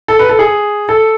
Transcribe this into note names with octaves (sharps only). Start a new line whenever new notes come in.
A4
B4
A4
G#4
A4